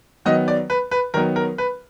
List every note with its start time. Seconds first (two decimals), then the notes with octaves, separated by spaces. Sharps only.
0.25 D#3 F#3 B3 D#5
0.48 D5
0.70 B4
0.91 B4
1.14 D#3 F#3 B3 A#4
1.36 A#4
1.58 B4